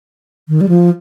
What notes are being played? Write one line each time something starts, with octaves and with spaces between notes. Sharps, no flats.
D#3
G3
F3